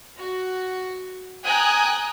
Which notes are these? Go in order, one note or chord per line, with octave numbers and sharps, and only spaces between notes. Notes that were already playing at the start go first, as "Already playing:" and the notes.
F#4
G5 G#5 A#5 D#6 F#6